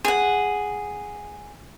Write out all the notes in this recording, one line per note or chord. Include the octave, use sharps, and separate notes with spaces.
G#4 F#5